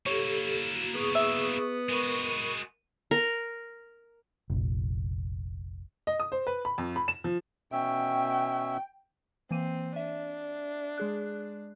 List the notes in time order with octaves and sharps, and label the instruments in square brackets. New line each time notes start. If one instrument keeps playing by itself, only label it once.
[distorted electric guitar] A#3 E4 [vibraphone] G4 A4 [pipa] C#5
[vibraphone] F#4
[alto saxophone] B3 [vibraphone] G#4 C#6 D#6
[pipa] E5
[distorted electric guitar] G#3 F#4 [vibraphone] A#4 B5 C#6
[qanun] A#4
[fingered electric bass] F1 A#1
[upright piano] D#5
D#6
C5
B4
B5
F2
B5
E7
F3
[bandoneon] B2 C#4 E5 [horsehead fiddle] G5
[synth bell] E3 A#3 D#7 [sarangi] C4
[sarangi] D4 [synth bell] E5
[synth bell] G#3 G#4 F#6